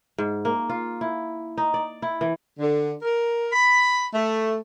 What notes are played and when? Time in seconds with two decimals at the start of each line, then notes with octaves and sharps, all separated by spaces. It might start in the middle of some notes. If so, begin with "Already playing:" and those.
0.18 G#2
0.45 A#3
0.70 F4
1.01 E4
1.58 D#4
1.74 D5
2.02 E4
2.21 E3
2.59 D3
3.01 A#4
3.51 B5
4.12 A3